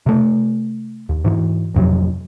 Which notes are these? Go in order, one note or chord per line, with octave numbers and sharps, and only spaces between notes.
C3 A3
D#2
G#2 E3
A1 F2 C3 F#3